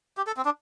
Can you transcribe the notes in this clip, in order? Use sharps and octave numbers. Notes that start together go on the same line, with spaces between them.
G4
A4
C4
D4